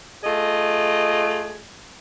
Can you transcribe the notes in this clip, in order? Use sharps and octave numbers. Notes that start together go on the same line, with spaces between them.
A3 F4 G#4 D#5